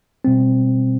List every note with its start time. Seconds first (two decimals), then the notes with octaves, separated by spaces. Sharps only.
0.25 B2 G3 C4